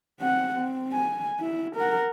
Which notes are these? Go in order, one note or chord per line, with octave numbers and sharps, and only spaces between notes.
C4 F#5
C4
G#5
E4
A#4 F#5